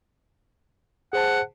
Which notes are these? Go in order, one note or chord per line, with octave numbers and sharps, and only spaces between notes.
G#4 C5 F#5 A5